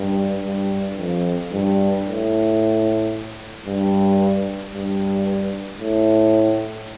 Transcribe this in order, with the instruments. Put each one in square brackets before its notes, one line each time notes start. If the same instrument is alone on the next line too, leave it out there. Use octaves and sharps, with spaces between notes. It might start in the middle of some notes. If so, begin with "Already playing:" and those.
Already playing: [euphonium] G2
G2
F2
G2
A2
G2
G2
A2